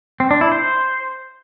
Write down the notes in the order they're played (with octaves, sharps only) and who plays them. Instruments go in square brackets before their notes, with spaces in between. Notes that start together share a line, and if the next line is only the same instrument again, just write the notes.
[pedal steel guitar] C4
D4
E4
C5